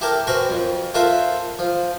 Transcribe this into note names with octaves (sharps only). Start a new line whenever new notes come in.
E4 G4 A4 A#4
C4 F#4 A#4 B4 G#5
F2
F4 A4 A#4 C5 E5 F#5
F3